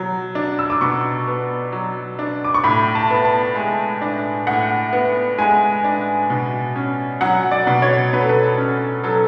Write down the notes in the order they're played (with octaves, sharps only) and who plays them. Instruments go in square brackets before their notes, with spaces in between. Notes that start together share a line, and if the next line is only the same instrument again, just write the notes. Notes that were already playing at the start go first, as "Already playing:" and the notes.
Already playing: [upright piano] B2 F#3
D4
E6
D6
B2 C#6
B3
F#3
D4
D6
C#6
A2 B5
A5
B3
A5
G#3 G#5
D4
A2 F#5
B3
G#3 G#5
D4
B2
C#4
F#3 F#5
D5
B2
C#5
B2 B4
A4
B4
C#4
F#3 A4